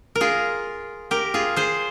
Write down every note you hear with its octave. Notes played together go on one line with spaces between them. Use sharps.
A#4
F4 G#4
G4 A#4
F4 G#4
G#4 C5